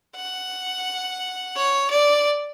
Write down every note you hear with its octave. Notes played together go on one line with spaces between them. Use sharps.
F#5
C#5
D5